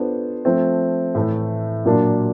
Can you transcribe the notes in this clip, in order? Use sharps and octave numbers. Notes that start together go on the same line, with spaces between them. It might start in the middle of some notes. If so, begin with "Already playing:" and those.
Already playing: B3 D4 F4 A4 C5
F3 A3 C4
A2 E3 A3
A#2 F#3 A#3 D4 F4